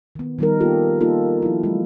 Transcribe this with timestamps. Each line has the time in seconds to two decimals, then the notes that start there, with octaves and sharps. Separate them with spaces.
0.15 D#3 B3
0.39 D#3 F3 G3 B3 D#4 A#4
0.60 A#3 B3 F4 G4 A4
1.01 A#3 D#4 F4 A4
1.42 F3 E4
1.64 F#3 G#3